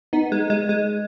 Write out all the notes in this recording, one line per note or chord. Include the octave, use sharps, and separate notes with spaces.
B3 D#4
G#3
G#3
G#3